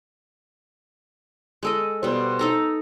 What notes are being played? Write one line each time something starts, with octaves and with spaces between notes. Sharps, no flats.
G#3 A4 D#5
B2 G3 C5
D#4 A4 A#5